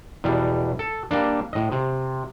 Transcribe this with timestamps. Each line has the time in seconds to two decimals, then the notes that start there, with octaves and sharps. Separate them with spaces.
0.24 E2 B2 G3
0.79 A4
1.11 G3 A#3 D4
1.53 A2 D#5
1.72 C3